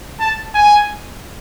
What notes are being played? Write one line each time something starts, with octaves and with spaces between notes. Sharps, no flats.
A5
G#5